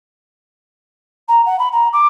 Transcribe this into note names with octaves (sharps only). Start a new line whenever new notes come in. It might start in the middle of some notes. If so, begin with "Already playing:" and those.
A#5
F#5
B5
A#5
D6